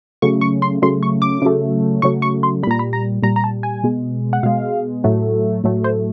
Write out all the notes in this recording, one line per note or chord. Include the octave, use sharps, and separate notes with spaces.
C#3 F#3 A3 C#6
C#6
C6
C#3 F#3 A3 C6
C#6
D6
C#3 F#3 A3
C#3 F#3 A3 C#6
C#6
C6
A#2 G3 A#5 B5
B5
A#5
A#2 G3 A#5
A#5
A5
G#5
B2 G#3
F#5
B2 G#3 F5
A2 F#3 A3
A2 F#3 A3
C5